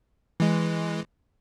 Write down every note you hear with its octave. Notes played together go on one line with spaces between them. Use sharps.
E3 G#3